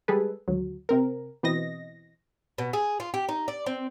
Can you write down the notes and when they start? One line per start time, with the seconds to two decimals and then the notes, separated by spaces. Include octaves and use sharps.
0.08 G3 G#3 G#4 A4 B4
0.48 G#1 D2 F#3
0.89 C3 C4 A#4
1.43 B2 E3 C4 D#5 A#6
2.58 B2
2.73 G#4
3.00 F4
3.14 G4
3.29 D#4
3.48 D5
3.66 C4